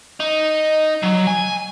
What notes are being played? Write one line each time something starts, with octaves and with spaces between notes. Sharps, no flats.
D#4
F#3
G#5